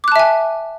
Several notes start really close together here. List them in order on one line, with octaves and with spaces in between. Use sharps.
D6 F#6 A5 E5 G#5